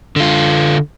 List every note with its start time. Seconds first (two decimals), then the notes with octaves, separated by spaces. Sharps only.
0.16 D3 F4